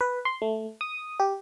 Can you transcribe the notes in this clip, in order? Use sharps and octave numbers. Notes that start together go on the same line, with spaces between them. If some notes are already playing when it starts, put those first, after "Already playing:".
B4
C6
A3
D#6
G4